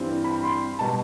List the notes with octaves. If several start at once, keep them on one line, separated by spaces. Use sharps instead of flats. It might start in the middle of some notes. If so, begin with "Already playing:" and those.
Already playing: G2 E3 G3 C4
B5
C6
B2 G3 A5